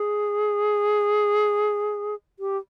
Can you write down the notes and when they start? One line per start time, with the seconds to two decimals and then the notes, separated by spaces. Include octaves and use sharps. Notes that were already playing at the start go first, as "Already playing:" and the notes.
Already playing: G#4
2.39 G4